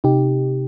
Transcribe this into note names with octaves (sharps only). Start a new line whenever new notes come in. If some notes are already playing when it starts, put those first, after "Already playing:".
C3 D#4 G4